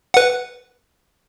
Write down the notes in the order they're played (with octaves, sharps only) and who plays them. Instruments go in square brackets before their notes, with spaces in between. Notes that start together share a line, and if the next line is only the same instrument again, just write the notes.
[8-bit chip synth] B4 F#5